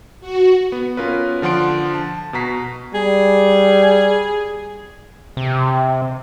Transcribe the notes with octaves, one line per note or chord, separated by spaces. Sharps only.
F#4
B3
B3 C#4 F4 A#4 B4
D3 F3 F#5 C6 D7
A5
B2 F#4 A#5 B6 C7
G3 G#4
C3